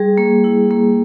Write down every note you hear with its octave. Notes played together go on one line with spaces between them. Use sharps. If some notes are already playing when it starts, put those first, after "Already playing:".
Already playing: G3 G#4
A#3
E4
A#3